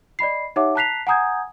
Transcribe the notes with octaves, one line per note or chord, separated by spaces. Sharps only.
D5 D#5 B5 C7
D#4 G4 C#5 E5 F#5 D6
A5 A#5 F#6 B6 C7 F7
F#5 G#5 A#5 D#6 G6 G#6